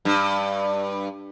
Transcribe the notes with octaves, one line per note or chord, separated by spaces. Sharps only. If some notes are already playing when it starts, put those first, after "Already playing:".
G2